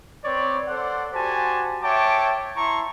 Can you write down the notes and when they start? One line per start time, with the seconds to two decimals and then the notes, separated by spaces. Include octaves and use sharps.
0.25 C4 B4 C#5 D5
0.68 A4 C5 D5 F#5
1.14 F#4 G4 C5 G#5 A5
1.83 C#5 E5 G5 A5 D6
2.56 E4 A5 A#5 C6 C#6